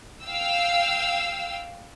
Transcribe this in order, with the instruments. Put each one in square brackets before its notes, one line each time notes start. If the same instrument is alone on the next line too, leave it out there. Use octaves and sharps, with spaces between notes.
[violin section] F5 G5 E6